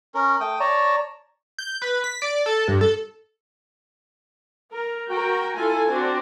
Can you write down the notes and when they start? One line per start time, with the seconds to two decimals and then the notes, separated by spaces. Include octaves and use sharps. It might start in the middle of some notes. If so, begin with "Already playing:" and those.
0.14 C#4 A#4
0.40 A3 G5 D#6
0.60 C#5 D5 A5 A#5
1.58 G6
1.82 B4
2.04 B6
2.22 D5
2.46 A4
2.68 G2
2.81 A4
4.69 A#4
5.10 F#4 A#4 G5
5.56 E4 F4 A4 G#5
5.88 C4 D4 F#4